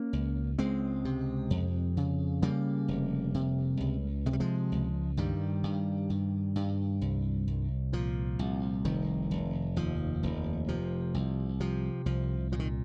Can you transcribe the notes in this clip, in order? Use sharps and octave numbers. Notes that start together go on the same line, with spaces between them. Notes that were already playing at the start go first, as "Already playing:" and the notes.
Already playing: A#3 C#4
C#2
C#2 G#3 C4
C3
F2
C#3
C#3 G3 A#3
F1
C3
C#2
C3 G#3
G3
F3 G#3
C#2
G2 D#3 G3
G2
G2
G2
C2
C2
A#2 F3
C2
F1 D#3
F1
D#2 F3
F1
C3 F3
C2
C3 F3
C2 F3
A#2 F3
D#3